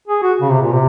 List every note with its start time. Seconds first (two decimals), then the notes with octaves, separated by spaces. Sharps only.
0.08 G#4
0.23 F#4
0.41 C#3
0.52 C3
0.62 A#2
0.73 C3